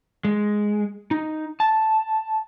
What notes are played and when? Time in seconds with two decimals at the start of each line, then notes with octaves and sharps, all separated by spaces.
0.25 G#3
1.11 D#4
1.60 A5